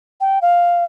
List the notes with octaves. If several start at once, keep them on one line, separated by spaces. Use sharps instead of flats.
G5
F5